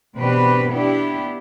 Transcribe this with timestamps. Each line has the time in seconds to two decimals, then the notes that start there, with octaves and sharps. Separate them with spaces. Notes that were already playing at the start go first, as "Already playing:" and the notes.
0.14 B2 E3 C4 D4 G4 B4
0.70 B3 D4 E4 G4